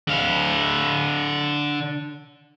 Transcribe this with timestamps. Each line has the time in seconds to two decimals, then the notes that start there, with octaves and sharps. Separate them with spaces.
0.07 D3 F5